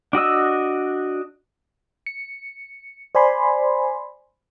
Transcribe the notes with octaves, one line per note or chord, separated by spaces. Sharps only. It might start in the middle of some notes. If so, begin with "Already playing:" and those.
D4 F#4 D#5 E6
C#7
C5 D5 G#5 B5 C6